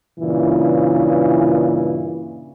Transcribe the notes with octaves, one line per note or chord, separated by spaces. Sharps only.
G2 A#2 C#3 E3